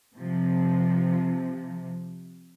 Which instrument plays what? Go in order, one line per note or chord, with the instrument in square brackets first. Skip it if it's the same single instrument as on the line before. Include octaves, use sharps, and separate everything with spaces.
[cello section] C3 F3